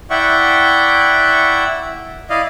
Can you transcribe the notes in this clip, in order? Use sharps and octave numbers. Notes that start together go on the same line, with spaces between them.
E4 D5 E5 F#5 G5 C#6
E4 D5 D#5 F5